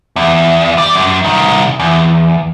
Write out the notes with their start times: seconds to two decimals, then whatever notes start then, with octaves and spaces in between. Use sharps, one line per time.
0.16 E2
0.77 G3 D5
0.95 F#2
1.24 C2 D#3
1.80 E2